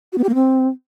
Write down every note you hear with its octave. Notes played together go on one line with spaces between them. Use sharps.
F#4
B3
G4
A#3
C4